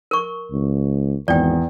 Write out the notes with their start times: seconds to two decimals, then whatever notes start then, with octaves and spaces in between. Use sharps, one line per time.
0.11 A#4 C#6
0.51 C#2
1.28 G#1 E2 D5 G5